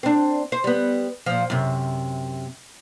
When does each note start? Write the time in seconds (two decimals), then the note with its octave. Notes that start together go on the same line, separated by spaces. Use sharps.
0.03 C4 D4
0.52 C5
0.64 G3 B3
1.26 A#2 F3
1.50 F#2 C3